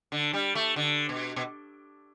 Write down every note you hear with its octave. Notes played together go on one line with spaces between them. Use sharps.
D3
G3
A3
D3
B2
B2